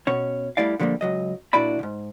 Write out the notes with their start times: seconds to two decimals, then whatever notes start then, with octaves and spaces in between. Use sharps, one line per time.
0.07 B2 C#4 C#5
0.57 G3 A3 E4 D5 F5
0.80 D3 F3 G3 A3 A#3
1.01 C#2 F#3 D#5
1.53 A#2 D4 E4 F#4 D5 B5
1.79 C#2 G#2